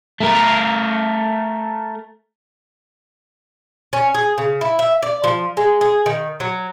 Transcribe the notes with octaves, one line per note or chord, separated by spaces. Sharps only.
A3 A#4
C#4
G#4
C#3
E4
E5
D5
F3
G#3
G#4
D#3
F#3